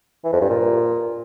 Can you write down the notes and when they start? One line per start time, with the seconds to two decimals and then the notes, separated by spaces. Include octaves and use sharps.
0.24 E3
0.33 F2
0.41 G2
0.50 A#2